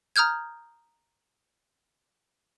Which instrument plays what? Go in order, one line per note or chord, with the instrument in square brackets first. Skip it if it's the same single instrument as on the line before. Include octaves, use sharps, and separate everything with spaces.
[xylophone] A#5 D#6 F6 G6 G#6